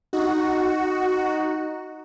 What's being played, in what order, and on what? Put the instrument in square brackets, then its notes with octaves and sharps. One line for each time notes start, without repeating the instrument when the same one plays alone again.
[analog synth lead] D#4 [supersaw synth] F#4